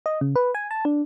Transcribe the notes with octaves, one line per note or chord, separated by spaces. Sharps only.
D#5
C#3
B4
G#5
A5
D4